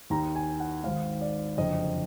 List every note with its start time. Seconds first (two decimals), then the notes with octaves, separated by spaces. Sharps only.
0.10 D#2 D#3 A#5
0.36 G#5
0.60 F#5
0.83 G#1 G#2 D#3 F5
1.21 D5
1.57 F#1 F2 D3 D#5